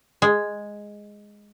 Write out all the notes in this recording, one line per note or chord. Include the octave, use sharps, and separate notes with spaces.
G#3